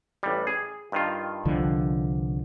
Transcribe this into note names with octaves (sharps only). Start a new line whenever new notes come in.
A1 G3
G#4
G2 D#3 F4
C2 D3 F3